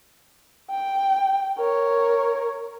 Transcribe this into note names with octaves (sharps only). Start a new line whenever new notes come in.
G5
A#4 C#5